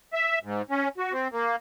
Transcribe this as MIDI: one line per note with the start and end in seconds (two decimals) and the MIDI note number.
0.13 0.39 76
0.43 0.62 44
0.70 0.88 61
0.98 1.12 66
1.12 1.28 60
1.32 1.56 58